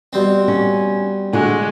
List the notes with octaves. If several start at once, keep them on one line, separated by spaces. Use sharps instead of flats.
B2 G3 C4
C#4
D3 G#3 F#4